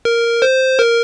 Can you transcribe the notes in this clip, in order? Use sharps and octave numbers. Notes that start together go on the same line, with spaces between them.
A#4
C5
A#4